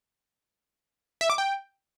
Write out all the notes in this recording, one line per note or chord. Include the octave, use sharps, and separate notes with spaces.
E5
D6
G5